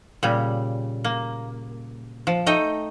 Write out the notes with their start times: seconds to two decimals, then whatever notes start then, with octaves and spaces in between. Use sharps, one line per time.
0.23 A#2 C#3 G3
1.04 A#3
2.27 F3
2.46 A3 D#4 D#5 G5